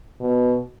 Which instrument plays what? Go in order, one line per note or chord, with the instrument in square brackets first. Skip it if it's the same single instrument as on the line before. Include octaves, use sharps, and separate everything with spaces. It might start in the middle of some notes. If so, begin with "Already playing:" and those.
[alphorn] B2